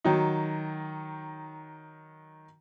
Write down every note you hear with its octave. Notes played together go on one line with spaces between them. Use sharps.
D#3 F#3 D#4